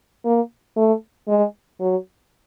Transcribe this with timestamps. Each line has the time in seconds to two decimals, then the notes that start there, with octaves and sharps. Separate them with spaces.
0.25 A#3
0.77 A3
1.28 G#3
1.80 F#3